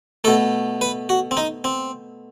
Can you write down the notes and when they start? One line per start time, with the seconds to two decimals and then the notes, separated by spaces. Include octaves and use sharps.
0.24 B2 A3 A4
0.81 B4
1.09 F#4
1.31 C4
1.37 D#4
1.64 C4